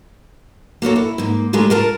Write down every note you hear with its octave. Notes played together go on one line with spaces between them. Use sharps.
A#3 F#4 A4 C#5
E4
G#2 A#3
C#3 G#3 A3 G4 A#4
F4 A#4 A5